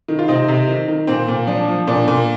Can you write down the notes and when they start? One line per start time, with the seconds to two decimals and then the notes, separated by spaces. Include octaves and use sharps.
0.08 D#3
0.19 F4
0.28 C3 C4 D#4
0.48 C3
0.68 D#3
0.88 D#3
1.07 A#2 C4
1.28 A#2
1.47 F3 D4
1.68 F3
1.87 A#2 D4
2.08 A#2